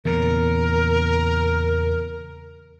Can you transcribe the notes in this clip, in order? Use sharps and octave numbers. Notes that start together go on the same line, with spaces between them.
E2 A#2 C#3 A#4